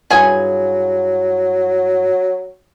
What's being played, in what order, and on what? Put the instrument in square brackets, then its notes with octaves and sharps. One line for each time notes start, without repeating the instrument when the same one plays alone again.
[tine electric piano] G2 E4 F4 [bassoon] F#3 [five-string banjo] G#4 G#5